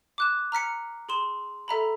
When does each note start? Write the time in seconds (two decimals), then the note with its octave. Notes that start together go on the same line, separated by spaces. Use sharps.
0.18 D6 F#6 E7
0.52 A#5 F6 B6 C#7
1.09 G#4 C6 E7
1.68 A4 E5 A#5 B5